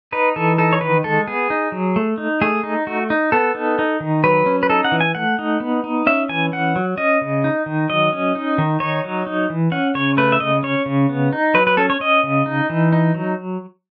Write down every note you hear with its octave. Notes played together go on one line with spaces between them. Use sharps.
D#4 B4
E3 A4
D#4 A4
C#5
D#3 B4
G#3 A4
B3 G#4
D#4
F#3
A3
D#4
A3 G#4
D#4
A3 F#4
D#4
B3 A4
D#4
D#4
D#3
F#3 B4
C#4
B4
D#4 A4
F#5
E3
G#5
A3 F#5
D#4
B3
D#4
C#4 E5
E3 G#5
C#4 F#5
F#3
C#4 D#5
C#3
D#4
D#3
F#3 D#5
C#4
D#4
D#3
D#4 C#5
F#3
D#4
E3
C#4 F#5
C#3 C#5
A3 B4
E5
C#3 D#5
C#4 C#5
C#3
B3
D#4
F#3 B4
B4
C#4 A4
C#5
C#4 D#5
C#3
D#4
E3
D#4
F#3